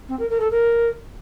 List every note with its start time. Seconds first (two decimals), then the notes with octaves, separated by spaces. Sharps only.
0.09 C4
0.19 A#4
0.30 A#4
0.40 A4
0.51 A#4